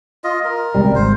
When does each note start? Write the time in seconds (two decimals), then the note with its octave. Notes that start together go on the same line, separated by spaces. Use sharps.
0.24 F4 D#5
0.45 A#4
0.75 C#2 C3 G3
0.95 G#1 C5